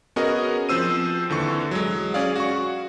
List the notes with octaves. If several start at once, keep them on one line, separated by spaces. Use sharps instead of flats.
B3 C#4 F#4 G#4 A#4 D#5
F3 C4 C5 E6 D#7
D#2 D3 E3 C#6
F#3 G#3
C#4 G#4 D5 F5
F#4 C#6